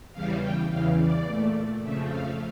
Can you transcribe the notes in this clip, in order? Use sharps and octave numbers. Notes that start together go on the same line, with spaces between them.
E2 C#3 E3 G3 F5
G5
E2 C#3 E3 F5
D5
A#2 A3
F2 C#3 F3 A3 E5
F5